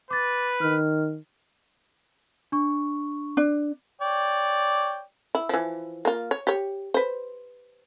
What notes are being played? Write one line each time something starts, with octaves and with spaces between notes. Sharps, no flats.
B4 D6 A6
D#3 F6
D4 C#6
D4
C#5 D5 G5
E4
E3 F3
A#3 F4
C#5
G4 C#5
B4 C5